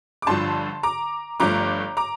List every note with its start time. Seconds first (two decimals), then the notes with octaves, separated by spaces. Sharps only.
0.22 D6
0.26 G1 G2 D3 F3 A5 C6
0.83 A#5 D6
1.40 G1 G2 F3 A3 A#5 D6
1.97 A#5 D6